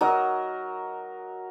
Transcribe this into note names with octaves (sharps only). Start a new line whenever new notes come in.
F#3 A#4 D#5